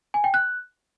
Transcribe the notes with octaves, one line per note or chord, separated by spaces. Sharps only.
G#5
G5
F#6